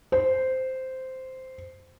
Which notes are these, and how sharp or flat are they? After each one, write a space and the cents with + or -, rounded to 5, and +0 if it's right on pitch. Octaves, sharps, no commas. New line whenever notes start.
C5 -10